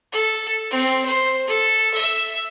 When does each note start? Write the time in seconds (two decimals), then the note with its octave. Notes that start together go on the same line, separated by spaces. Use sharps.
0.12 A4
0.71 C4
1.05 C5
1.47 A4
1.94 E5